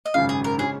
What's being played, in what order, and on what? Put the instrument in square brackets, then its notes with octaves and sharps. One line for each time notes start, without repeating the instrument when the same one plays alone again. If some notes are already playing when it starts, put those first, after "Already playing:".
[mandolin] D#5
[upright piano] G#1 F#2 C#3 [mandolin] F5
[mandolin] G#4
A#4
[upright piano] C#3 G#3 C#4 [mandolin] G#4